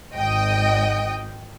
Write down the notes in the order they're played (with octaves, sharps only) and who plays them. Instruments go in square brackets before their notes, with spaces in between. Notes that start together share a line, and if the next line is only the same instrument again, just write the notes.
[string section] G#1 D#5 G5